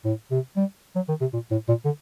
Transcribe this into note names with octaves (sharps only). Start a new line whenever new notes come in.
A2
C3
G3
F#3
D#3
C3
A#2
A2
A#2
D3